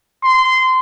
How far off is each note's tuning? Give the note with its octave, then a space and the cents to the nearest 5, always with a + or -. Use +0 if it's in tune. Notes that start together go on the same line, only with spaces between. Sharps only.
C6 -20